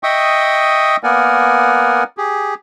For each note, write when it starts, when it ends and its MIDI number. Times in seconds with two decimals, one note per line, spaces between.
0.03 0.96 75
0.03 0.96 76
0.03 0.96 79
0.03 0.96 85
0.03 0.96 87
1.03 2.04 58
1.03 2.04 59
1.03 2.04 70
1.03 2.04 74
1.03 2.04 78
1.03 2.04 80
2.17 2.54 67
2.17 2.54 68